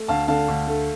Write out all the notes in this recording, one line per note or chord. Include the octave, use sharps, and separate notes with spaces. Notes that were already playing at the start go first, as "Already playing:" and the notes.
Already playing: A3
D2 F5 A5
D3 F5 A5
D2
A3